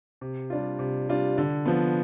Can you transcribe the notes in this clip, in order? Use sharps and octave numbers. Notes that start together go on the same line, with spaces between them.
C3
G3 D4 F4
C3
G3 D4 F4
D3
F3 B3